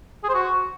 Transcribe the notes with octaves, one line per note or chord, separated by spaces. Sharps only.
G#4
C5
F#4